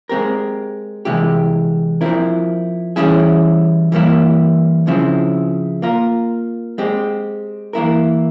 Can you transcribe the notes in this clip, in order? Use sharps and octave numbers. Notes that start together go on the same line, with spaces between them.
G#3 C4 G4 A#4
C3 E3 G#3 E4 G4
F3 C4 E4 A#4
E3 G3 C#4 E4 G#4
E3 G3 A#3 E4
C#3 F3 C4 E4
A#3 F4 A#4
G#3 C4 G4
E3 A#3 E4 A#4